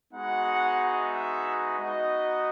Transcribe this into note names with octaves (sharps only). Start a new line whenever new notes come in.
G#3 B3 D#4 F#4 F#5
E5
B3 D#4 F#4 D#5